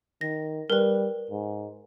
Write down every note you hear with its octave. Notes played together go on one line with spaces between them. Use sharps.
D#3 A#6
G3 A#4 B4
G#2